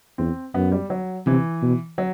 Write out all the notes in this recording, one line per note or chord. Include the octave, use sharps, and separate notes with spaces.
E2 C4
F#2 B3
G3
F#3
C3 E3
B2
F#3